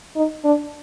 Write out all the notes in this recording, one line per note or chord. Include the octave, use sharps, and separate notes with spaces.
D#4
D4